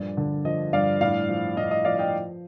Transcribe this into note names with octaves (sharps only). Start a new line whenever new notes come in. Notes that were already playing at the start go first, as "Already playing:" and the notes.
Already playing: G2 A#2 F3 D5
D3
F3 D#5
G2 D5 F5
A2 D5 F5
F3
A2 D#5
D#5
F3 D5 F5
D#5 G5